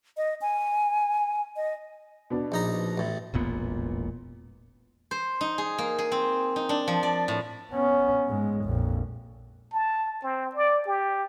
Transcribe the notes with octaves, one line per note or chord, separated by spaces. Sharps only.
D#5
G#5
D#5
B2 B3 D4
A#1 D#4 A#5
A1 A2
E1 A1 A#2 B3
C5
D#4
G#4
A#3
G#4
C4
D#4
D4
F3
D5
A2
B3 C#4
G#2 G#3
A#1 F2
A5
C4
D5
G4